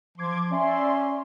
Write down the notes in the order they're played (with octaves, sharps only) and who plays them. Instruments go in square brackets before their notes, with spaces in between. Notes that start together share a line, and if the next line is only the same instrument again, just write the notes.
[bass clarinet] F3 [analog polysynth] C6 D6 G#6
[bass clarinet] C#4 [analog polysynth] D5 E5 C6